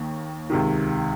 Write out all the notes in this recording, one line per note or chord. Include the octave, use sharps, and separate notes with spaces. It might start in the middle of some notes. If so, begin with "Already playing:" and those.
Already playing: D#2 D#3
C#2 C3 D#3